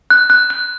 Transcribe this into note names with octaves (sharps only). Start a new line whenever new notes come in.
F#6
F#6
F#6